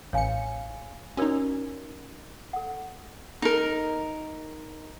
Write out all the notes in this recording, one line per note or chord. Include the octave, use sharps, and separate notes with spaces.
A1 C#5 F5 G#5 C#7
C#4 D#4 F#4 A#4 D5
A4 F#5
D#4 A#4